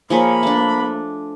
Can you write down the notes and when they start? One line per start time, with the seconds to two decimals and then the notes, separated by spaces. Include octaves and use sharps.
0.10 F3 A#3 G#4 C#5 B5
0.43 A3 D4